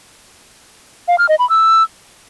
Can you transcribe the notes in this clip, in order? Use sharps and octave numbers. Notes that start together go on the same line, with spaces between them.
F5
F6
D#5
B5
E6